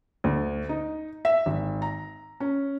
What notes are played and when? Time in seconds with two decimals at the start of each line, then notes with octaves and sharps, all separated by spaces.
0.24 D2
0.69 D#4
1.25 E5
1.46 G#1
1.82 A#5
2.40 C#4